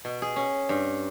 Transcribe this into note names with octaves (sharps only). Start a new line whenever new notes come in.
B2
G#4
C#4
G2